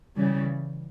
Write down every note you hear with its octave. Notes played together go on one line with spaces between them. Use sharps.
C#3 E3 G3